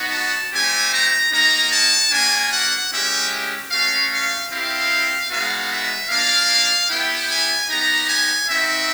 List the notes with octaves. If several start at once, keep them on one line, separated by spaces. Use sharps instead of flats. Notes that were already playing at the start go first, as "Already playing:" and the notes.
Already playing: B3 D#4 F#4
A5
A3 C4 E4 G4 G#5
A#5
A#3 D#4 F#4 A#5
A5
A#3 D4 F#4 G#5
F#5
G#3 C#4 E4 G4 E5
A3 C#4 F#4 F5
F5
C4 E4 G4 F5
G#3 B3 D#4 F#4 F5
E5
A#3 D4 F4 F5
B3 E4 G4 G5
G#5
B3 D#4 G4 A#5
G#5
C4 D#4 F#4 E5